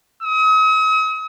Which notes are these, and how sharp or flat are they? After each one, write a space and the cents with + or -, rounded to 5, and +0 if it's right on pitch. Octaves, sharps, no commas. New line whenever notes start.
D#6 +45